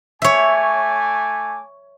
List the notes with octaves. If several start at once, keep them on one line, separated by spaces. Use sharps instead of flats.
A3 C#5 E5 G#5 D6